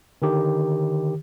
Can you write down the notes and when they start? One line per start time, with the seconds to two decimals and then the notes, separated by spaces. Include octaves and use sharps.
0.22 D3 D#3 G4